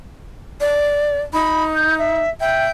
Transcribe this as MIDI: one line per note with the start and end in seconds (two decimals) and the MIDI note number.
0.60 1.21 74
1.33 2.20 63
1.33 1.63 83
1.74 1.94 91
1.98 2.29 76
2.40 2.69 76
2.40 2.70 79